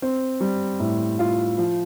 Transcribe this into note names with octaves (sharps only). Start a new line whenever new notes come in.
C4
G3
A2
F4
F3